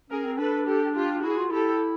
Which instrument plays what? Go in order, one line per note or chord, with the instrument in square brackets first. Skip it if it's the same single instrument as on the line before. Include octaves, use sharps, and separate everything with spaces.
[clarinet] C#4 [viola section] G#4 A#4
[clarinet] C4
[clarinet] D4 [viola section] A4 B4
[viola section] G4 A4
F4 G4
[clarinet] E4 [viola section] F#4 G#4
[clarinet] F4
[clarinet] E4 [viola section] G4 A4